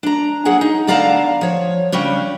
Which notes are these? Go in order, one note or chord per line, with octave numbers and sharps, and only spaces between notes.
D4 A#5
F#3 A#3 G#4 F#5
D#4
D3 B3 D5 F5 A5 A#5
F3 C#5
C#3 G3 C#4 D4